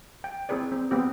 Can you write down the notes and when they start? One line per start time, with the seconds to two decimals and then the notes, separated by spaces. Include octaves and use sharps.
0.24 G5
0.49 C4 E4 G#4 B4 D5
0.72 C4
0.91 B3 C4 G4